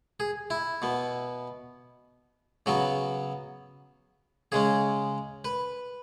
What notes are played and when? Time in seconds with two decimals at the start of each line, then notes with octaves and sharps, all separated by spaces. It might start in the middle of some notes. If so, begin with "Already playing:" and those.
0.20 G#4
0.50 E4
0.82 B2 B3
2.66 C#3 F#3 B3 F#4
4.52 C#3 G#3 C#4 G#4
5.45 B4